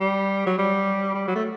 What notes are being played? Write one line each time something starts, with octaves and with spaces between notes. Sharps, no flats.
G3
F#3
G3
G3
F#3
A3